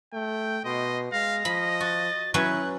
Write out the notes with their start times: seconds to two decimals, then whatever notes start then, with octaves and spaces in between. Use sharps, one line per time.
0.13 A3 G5
0.65 B2 D#5 C6
1.12 G#3 F5 A#6
1.45 F3 D#5 B5
1.80 F#4 A6
2.34 F#3 C#4 E4 B4 F#6